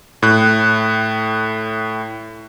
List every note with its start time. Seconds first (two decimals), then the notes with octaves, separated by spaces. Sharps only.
0.22 A2 F#6